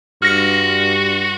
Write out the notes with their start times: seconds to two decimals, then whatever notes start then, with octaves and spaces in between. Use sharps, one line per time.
0.22 G2 F#4 F6 A#6 C#7